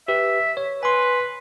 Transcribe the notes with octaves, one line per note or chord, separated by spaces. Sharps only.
G4 B4 E5
C#5
B4 G#5 C6